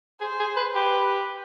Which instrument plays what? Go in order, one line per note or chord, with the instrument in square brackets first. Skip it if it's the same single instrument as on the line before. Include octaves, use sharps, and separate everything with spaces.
[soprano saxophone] G#4 [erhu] C5
[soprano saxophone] G#4
B4
[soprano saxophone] G4 [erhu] B4